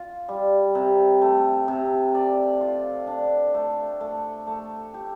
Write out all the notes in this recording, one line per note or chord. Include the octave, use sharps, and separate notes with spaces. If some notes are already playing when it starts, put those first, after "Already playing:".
Already playing: F4
G3
C3
A3
C3
D5
F4
D4
A3
A3
A3
G4